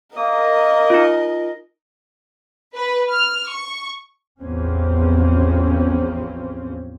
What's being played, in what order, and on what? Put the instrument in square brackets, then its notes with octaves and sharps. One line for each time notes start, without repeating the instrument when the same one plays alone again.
[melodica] A#3 D#6 [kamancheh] A#4 D#5
[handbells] D#4 F4
[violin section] B4
F6
C#6
[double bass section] A1 E2 F3 C4 C#4